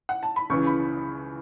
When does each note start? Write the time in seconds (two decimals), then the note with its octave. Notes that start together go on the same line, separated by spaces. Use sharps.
0.09 F#5
0.23 A5
0.36 B5
0.50 C#2 C#3 E3 C#6
0.67 B5